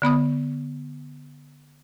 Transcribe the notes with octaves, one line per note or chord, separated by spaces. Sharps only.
D3 B3 B5 D#6